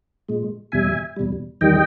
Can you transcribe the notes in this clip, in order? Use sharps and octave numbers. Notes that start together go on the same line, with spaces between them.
A#2 G#3
E2 B2 G3 E5 G#5
E2 B2 G3
E2 D#3 G3 D#5 G5